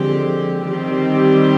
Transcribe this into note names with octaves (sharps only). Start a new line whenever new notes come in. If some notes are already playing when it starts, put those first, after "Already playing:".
Already playing: D3 F3 G#3 C4 G4
D#3 G3 C4 G4